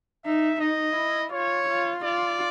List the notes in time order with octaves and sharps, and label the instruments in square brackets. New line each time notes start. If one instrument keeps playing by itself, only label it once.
[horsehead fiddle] D#4 [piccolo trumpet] E5
[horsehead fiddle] D#4 [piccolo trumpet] D#5
[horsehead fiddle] E4
[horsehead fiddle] F4 [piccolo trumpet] C#5
[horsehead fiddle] F4
[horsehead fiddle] F4 [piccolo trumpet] D5